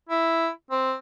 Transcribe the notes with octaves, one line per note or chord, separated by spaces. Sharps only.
E4
C4